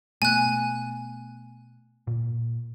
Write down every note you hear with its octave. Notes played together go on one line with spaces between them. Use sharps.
B2 A3 B3 G#5 F#6
A#2